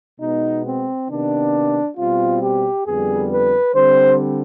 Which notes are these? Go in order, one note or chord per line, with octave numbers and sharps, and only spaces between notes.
B2 G#3 B3 D#4
C4
C3 D#3 B3 D4
B2 G3 C4 F4
G4
F2 D3 G3 B3 G#4
B4
D3 G3 C4 C5